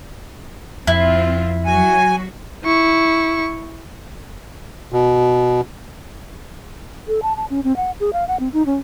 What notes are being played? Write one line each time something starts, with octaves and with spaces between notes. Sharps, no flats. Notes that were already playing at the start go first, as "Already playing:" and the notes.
F2 C4 E4 F4
F#3 F#4 G#5
E4 C#6
B2
A4
A5
A5
C#4
C4
F#5
G#4
F5
F#5
C4
D#4
C#4